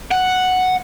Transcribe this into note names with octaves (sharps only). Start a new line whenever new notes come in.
F#5